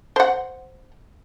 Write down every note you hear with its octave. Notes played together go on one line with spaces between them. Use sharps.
C5 F#5